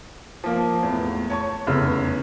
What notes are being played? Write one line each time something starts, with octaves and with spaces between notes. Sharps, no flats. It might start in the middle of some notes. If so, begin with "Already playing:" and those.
F3 A#3
E2 A2
C#5 A5 C#6
F1 E2 C#3 E6